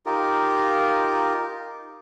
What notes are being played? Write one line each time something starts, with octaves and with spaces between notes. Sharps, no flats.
D#4 F4 G4 A#4